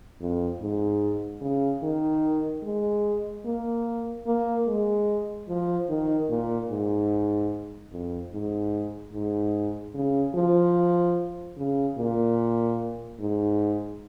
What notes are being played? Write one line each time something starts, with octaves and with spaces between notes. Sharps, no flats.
F2
G#2
C#3
D#3
G#3
A#3
A#3
G#3
F3
D#3
A#2
G#2
F2
G#2
G#2
C#3
F3
C#3
A#2
G#2